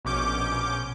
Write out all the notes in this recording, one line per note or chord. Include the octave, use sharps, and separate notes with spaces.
A#1 B2 C#4 D6 G6